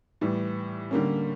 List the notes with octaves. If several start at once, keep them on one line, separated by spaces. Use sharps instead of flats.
A2 E3 G3
D3 G3 A#3 C#4